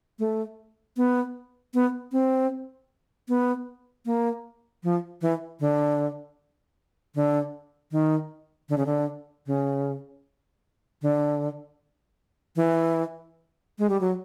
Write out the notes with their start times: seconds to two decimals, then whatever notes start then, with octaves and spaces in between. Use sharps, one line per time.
0.19 A3
0.97 B3
1.74 B3
2.12 C4
3.29 B3
4.06 A#3
4.84 F3
5.22 E3
5.60 D3
7.15 D3
7.92 D#3
8.69 D3
8.78 C#3
8.86 D3
9.47 C#3
11.02 D3
12.56 E3
13.79 G#3
13.89 G3
14.01 F#3